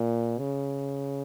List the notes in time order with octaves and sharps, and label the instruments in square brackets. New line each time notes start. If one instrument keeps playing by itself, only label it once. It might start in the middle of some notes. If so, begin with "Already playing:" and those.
Already playing: [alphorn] A#2
C#3